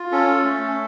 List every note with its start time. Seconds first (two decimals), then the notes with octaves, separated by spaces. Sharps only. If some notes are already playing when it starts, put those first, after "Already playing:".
Already playing: F4
0.12 C#4 A4
0.44 A3